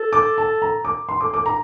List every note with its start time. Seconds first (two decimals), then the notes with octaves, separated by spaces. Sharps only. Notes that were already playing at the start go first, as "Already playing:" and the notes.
Already playing: A4
0.13 D6
0.38 A5
0.62 A#5
0.85 D6
1.09 A4 C6
1.21 D6
1.34 D6
1.46 A#5